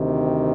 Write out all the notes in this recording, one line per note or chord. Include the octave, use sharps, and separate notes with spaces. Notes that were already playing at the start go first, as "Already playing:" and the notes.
Already playing: D2 C3 D#3